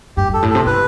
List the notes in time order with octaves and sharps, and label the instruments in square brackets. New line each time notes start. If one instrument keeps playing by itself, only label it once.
[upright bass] G2 [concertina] G4
[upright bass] G2 [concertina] A4
[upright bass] A2
[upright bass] C3 [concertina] A4
[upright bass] C3 [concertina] B4